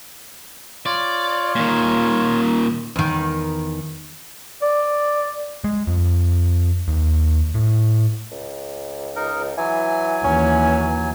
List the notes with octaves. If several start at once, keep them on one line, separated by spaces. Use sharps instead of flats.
F4 C#5 D5
A#2 D#3
E2 D#3
D5
G#3
F2
D#2
A2
C#2
D#4 A#4
E3 F#3 G#5
D#2 E3 C#4